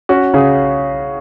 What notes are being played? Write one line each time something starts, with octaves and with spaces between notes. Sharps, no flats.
C#4 F#4
C#3 G#4